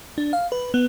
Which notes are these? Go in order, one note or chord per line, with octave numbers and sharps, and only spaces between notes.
D4
F5
B4
B3